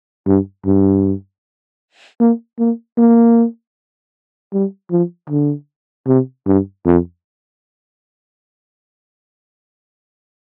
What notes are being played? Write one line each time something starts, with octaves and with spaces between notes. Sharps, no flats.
G2
G2
A#3
A#3
A#3
G3
F3
D3
C3
G2
F2